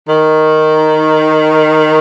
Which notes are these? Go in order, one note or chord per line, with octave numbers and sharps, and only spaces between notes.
D#3